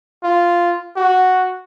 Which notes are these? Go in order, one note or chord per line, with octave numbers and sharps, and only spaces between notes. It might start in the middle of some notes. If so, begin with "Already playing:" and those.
F4
F#4